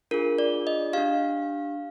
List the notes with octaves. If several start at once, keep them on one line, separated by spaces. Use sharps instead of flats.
D4 F4 G#4 A#4
D5
D#5
D4 G4 F5